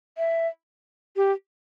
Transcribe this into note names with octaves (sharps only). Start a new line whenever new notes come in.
E5
G4